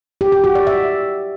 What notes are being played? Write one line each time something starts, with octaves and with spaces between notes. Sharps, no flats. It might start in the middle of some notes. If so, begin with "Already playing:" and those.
G4
G4
F#4
D5
E5